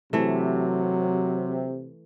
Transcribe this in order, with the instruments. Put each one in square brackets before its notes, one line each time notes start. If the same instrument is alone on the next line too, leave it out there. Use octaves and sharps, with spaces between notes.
[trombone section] C3 [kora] E3 A3 [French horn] F#3